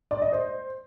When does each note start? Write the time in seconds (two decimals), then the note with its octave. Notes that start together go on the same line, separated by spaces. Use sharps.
0.11 D5
0.22 D#5
0.33 C5